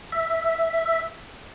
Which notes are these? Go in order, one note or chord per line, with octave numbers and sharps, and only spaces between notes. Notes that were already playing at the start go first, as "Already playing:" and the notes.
E5